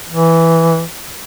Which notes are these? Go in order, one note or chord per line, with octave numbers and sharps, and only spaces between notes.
E3